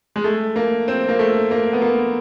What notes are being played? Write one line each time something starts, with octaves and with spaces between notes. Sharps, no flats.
G#3
A3
A#3
C4
A#3
A3
A#3
B3
A#3